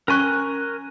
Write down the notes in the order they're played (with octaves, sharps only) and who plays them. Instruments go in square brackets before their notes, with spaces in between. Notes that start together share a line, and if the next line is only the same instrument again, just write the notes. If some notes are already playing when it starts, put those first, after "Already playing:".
[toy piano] C#4 C#6 [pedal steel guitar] A#4 G#5 F#6